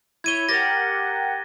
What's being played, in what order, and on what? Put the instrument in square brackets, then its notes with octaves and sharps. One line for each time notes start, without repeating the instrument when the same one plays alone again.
[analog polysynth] E4 C#5 [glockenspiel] G#6 D#7 G7
[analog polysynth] G4 A#4 F#5 [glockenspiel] A6 A#6